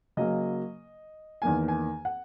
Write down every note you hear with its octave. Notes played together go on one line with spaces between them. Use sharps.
C#3 F#3 A#3 D#5
E2 D#3 A#3 G#5
G#5
F#5